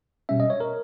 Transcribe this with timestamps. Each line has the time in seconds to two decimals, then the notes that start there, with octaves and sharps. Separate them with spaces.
0.29 B2 G3 C#4 E5
0.40 D#5
0.50 C#5
0.60 A#4